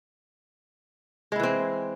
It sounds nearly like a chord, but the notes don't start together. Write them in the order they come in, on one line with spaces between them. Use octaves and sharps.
G#3 E4 E3 C4